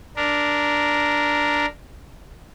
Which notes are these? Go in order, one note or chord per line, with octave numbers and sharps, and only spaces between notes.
D4 A#4